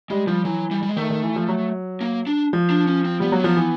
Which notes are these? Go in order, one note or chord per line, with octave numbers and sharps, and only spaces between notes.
G3 G#3
F3 G3
E3 F#3
G3
G3
G#3
D#3 A3
D#3
E3
F3
F#3
A#3
D4
F3
D4
C#4
C4
G3 B3
F#3 A#3
F3 B3
E3